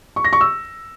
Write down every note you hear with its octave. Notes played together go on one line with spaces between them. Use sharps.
C#6
A#6
C#6
E6